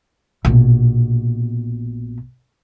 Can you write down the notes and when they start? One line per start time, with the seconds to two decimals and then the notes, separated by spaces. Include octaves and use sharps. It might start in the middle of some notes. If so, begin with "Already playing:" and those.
0.45 A#1 B2